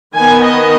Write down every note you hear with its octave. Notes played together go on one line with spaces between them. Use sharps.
D#3 B3 G#5
D#5